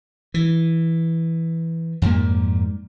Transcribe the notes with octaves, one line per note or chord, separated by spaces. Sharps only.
E3
F2 G#2 G3 A#3